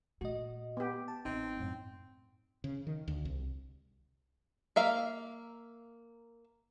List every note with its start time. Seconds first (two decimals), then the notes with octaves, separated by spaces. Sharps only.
0.21 A#2 A3 F#4 D#5
0.77 B3 G4
1.08 A5
1.25 A1 C4 D#4
1.60 F#2 A2
2.64 C#3
2.87 D#3
3.08 D2
3.25 C2
4.76 A#3 E5 F5